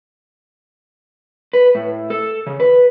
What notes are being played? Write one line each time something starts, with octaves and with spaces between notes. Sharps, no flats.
B4
A2
A4
C#3
B4